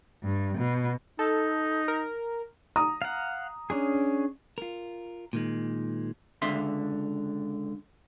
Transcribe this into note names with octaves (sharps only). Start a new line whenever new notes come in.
G2
B2
D#4 A4
A#4
A#5 D#6
F5 F#5
C#4 D4 G#4
F4 A#4
A#2 D#3 G#3
C#2 D3 E5 C6